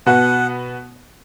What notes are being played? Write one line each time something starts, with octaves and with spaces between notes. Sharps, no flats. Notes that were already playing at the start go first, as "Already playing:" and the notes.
B2 B3 F#4 F#5